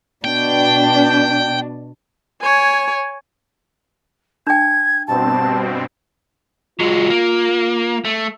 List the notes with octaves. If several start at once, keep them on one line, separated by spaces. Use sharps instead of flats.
B2 D4 G5
C#5 G#5
D4 G5 G#6
G2 B2 C4 A5
F#3 G#3 F4
A#3
A3